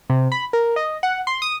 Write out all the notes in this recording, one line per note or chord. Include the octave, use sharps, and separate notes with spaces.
C3
B5
A#4
D#5
F#5
C6
D#6